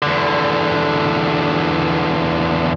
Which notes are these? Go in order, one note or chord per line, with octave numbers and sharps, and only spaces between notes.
E2 D3